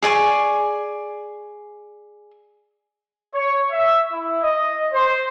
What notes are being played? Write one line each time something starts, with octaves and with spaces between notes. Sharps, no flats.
G#4 D5 G#5 C#6
C#5
E5
E4
D#5
C5